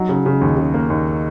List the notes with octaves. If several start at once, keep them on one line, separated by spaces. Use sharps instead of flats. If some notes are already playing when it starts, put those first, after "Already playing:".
Already playing: F#3 D#4
C#3
C#3
D#2
C#3
A#3
D#2